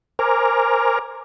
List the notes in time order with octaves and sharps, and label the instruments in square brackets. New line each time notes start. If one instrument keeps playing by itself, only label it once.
[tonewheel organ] A#4 C5 G#5 A#5 D6 F6